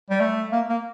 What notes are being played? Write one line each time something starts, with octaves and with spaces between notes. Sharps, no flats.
G3
A3
A#3
A#3